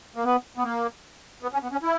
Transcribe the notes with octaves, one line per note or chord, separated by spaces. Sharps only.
A#3
B3
B3
A#3
B3
C#4
B3
C#4
E4